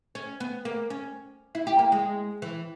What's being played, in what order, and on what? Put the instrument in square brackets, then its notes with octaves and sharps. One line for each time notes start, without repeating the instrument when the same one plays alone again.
[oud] C#4
B3
A#3
C#4
E4
G4
A#3
G#3
E3